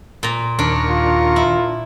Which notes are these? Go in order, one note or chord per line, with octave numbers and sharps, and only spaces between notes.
A#2 A#5
D#2 D4 A#4 C#6
F4
E4